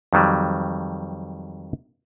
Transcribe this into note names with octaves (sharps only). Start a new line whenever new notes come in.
F2 D#3 F#3 G3